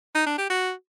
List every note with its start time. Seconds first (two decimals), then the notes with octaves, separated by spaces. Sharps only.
0.15 D#4
0.26 D4
0.38 G4
0.50 F#4